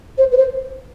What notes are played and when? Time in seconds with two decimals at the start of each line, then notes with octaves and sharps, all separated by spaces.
0.17 C5
0.31 B4
0.37 C5